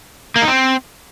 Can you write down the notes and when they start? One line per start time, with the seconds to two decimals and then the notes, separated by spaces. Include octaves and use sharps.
0.36 A#3
0.42 D#4
0.48 C4